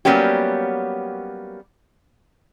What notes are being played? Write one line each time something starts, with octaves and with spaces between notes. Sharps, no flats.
F#3 G3 A#3 B3 C#4 G4